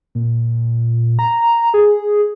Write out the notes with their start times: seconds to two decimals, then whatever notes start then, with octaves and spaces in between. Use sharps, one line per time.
0.15 A#2
1.19 A#5
1.74 G#4